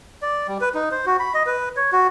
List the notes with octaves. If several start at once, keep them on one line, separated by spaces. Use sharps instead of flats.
D5
G3
B4
D#4
C5
F#4
B5
D#5
B4
C#5
F#4